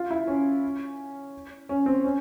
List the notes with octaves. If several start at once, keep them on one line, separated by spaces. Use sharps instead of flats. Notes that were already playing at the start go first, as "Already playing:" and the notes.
Already playing: F4
E4
C#4
C#4
C4
C#4